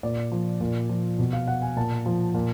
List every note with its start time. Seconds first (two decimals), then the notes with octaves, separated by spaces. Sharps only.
0.03 A#2 D5
0.32 F3
0.61 A#2
0.89 F3
1.19 B2
1.33 F5
1.47 F#5
1.62 G#5
1.76 A#2 A5
2.06 F3
2.34 A#2